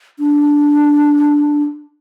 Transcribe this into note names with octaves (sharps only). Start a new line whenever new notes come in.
D4